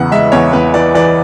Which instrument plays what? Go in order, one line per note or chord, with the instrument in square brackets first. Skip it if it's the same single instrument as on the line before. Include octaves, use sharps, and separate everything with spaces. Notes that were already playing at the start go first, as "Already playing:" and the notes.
Already playing: [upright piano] E2 C#3 [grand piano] F#5
[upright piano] G#3 [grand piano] E5
[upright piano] E2 [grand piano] C#5
[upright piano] E2 [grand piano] B4
[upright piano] E3 [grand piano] D5
[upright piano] E3 [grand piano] D5